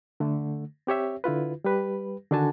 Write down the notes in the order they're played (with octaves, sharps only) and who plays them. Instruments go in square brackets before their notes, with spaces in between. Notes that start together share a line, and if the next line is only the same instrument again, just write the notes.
[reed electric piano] D3 A3
C4 G4 C#5 E5
D3 E4 F4 B4
G3 G4 B4
D3 D#3 D4 F#4 G#5 A5